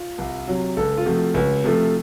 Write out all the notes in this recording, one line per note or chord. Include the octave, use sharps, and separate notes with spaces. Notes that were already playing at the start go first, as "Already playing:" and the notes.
Already playing: F4
C2
C3 F#3
C#2 A4
F4
C3 F3 A3 F#4
C#2
C3 F3 A3